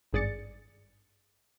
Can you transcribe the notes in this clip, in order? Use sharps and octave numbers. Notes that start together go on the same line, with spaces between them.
G#1 G2 G#4 D5 A6 C#7